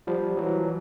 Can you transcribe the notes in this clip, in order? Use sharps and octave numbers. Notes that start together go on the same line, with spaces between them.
F3 G3
E3 F#3